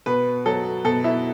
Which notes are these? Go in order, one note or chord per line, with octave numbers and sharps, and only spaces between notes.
B2 B4
F#3 A4
B2 A4
E4